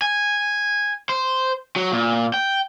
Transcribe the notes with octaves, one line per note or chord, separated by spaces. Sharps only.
G#5
C5
F#3
A#2
G5